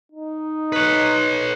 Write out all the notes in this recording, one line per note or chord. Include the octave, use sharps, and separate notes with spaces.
D#4
B4 C#5